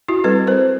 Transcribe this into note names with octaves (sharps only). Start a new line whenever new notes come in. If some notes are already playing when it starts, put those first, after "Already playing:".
E4 F#4
G3 C4 A4 B4
A#4 C5